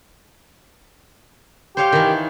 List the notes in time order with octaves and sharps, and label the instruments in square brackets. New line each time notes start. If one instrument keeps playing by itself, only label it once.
[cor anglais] G4 [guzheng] C5 C#5 F5
[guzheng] D#3 E3